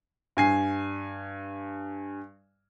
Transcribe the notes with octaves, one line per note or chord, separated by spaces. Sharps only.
G2 G#5 C7